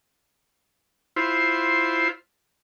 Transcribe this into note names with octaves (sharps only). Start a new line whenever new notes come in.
E4 F4 C5